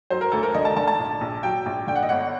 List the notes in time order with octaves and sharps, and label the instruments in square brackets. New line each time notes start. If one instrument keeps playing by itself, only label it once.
[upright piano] F#3 C5
A#4
D2 A4
A#4
D3 D#5
A5
D3 A5
A5
A#1
A#1
F#3 G5
A#1
D3 G5
F#5
D#5
G1 F#5